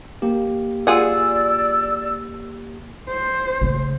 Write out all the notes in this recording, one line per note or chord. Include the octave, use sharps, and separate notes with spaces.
A#3 G4
F4 G#4 D5 F#5 E6
C5
C#3 A3